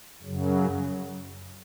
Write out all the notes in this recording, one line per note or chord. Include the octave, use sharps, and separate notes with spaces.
F#2 C#3 F#3